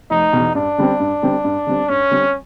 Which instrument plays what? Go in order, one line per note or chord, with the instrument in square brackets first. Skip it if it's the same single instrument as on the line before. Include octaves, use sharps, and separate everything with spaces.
[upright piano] F1 [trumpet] D#4
[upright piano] E2 B2
[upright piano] G2 [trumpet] D4
[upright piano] D3 G3 C4
G2
D3 G3 C4
G2
D3 G3 C4
[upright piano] G2 [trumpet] C#4
[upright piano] D3 G3 C4